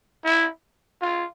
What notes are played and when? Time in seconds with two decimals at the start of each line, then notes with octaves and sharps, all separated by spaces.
0.24 E4
1.02 F4